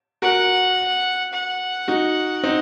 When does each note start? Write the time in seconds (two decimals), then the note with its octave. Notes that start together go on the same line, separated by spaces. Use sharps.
0.22 F#4 A#4 F#5
1.33 F#5
1.88 D#4 F#4
2.44 C4 D#4